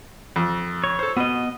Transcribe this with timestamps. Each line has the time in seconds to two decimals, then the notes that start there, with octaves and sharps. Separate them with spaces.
0.36 F2
0.84 C#5
0.99 A4 C5
1.17 B2 B3 D#5